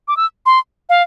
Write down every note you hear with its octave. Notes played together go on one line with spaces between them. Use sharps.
D6
E6
C6
F5